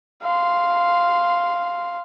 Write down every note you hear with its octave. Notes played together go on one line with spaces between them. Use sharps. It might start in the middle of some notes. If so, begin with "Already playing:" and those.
F5 C6